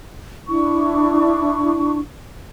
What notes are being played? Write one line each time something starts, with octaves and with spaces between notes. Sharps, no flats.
D4 E4 C#6